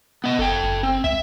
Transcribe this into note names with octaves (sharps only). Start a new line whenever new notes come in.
B3 D#5
F#1 A4 G5
F#1
C4
C#2 E5